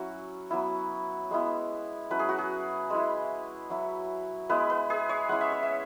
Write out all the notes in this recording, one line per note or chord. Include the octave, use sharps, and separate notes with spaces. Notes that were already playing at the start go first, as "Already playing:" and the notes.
Already playing: F#3 C#4 E4 F#4
F#3 B3 E4
G#3 B3 E4
F#3 C#4 E4 B4
G#4
F#4
G#4
G#3 E4
F#3 E4
G#3 B3 E4 B4
B4
G#4
C#5
G#3 C#4 E4 F#5
E5
C#5
E5